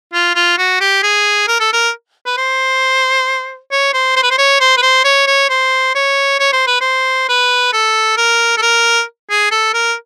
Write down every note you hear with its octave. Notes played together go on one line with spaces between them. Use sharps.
F4
F4
F#4
G4
G#4
A#4
A4
A#4
B4
C5
C#5
C5
C5
B4
C5
C#5
C5
B4
C5
C#5
C#5
C5
C#5
C#5
C5
B4
C5
B4
A4
A#4
A4
A#4
G#4
A4
A#4